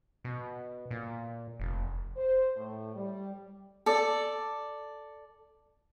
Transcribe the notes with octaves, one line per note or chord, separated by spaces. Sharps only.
B2
A#2
F1
C5
A2
G3
A4 D5